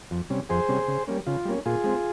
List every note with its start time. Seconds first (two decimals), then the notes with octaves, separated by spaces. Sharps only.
0.11 F2
0.30 C3 G3 C#4
0.49 F2 G#4 C5
0.68 C3 G3 C#4
0.88 C#3
1.07 G3 A#3 C#4
1.26 C#3 F4
1.45 G3 A#3 C#4
1.66 A#2 F4 G#4
1.84 G#3 C4